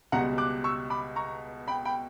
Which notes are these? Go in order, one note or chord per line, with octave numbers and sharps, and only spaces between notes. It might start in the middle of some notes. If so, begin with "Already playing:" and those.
C#2 B2 G3 F#5 A#5
D6 F#6
C#6 E6
B5 D6
A#5 C#6
G5 B5
G5 B5